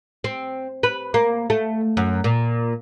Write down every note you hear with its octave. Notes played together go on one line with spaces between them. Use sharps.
C4
B4
A#3
A3
F#2
A#2